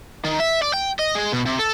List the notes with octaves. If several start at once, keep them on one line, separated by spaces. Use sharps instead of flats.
D#3
E5
D5
G5
D#5
G#3
B2
C3
A4